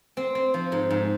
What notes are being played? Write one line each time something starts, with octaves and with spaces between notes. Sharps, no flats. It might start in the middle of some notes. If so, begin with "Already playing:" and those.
C4
C4
F3
G#2
G#2